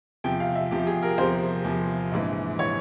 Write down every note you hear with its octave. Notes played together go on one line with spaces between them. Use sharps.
E2 C3 F3 G5
F5
E5
E2 C3 F3 G4
G#4
A#4
E2 C3 F3 C5
E2 C3 F3
A#1 G#2 E3
E3 C#5